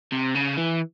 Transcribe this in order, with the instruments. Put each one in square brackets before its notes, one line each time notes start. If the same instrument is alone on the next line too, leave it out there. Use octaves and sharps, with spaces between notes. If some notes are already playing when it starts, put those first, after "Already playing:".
[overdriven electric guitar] C3
C#3
E3